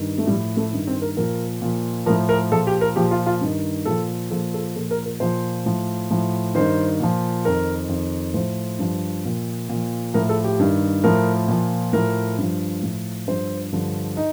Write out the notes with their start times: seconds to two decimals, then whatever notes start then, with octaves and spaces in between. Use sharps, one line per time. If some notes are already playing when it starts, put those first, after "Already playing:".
Already playing: G2 D#3
0.18 A3
0.27 A2 G3
0.31 F3
0.57 A3
0.73 G2 D#3
0.87 C4
1.02 A#4
1.17 A#2 F3 A#4
1.62 A#2 F3
2.06 F3 A#4
2.10 A2
2.29 A#4
2.51 A#2 F3 A4
2.67 G4
2.81 A#4
2.96 A#2 F3 G4
3.11 F4
3.26 F4
3.41 G2 D#3
3.85 A#2 F3 A4
4.31 A#2 F3 A4
4.54 A4
4.76 A#2 F3 A4
4.91 A#4
5.05 A#4
5.20 A#2 F3 C5
5.66 A2 F3
6.11 A2 F3
6.55 G2 D#3 C5
7.00 A#2 F3
7.45 F2 D#3 A#4
7.89 F2 D#3
8.34 A2 F3 C5
8.79 G2 F3
9.25 A#2 F3
9.69 A#2 F3
10.14 A2 F3 A#4
10.29 A4
10.44 G4
10.59 G2 D#3
11.04 A2 F3 A#4
11.48 A#2 F3
11.93 A2 F3 A#4
12.38 G2 F3
12.83 A2 F3
13.27 G2 F3 C5
13.72 G2 D3 F3
14.17 D#4